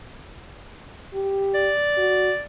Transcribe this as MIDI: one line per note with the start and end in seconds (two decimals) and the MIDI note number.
1.14 1.71 67
1.55 2.43 74
1.97 2.31 66